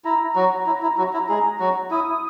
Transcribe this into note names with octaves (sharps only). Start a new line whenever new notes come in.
E4 A#5
F#3 F#4
E4
E4
F#3 F#4
E4
G#3 G#4
F#3 F#4
E4 D#6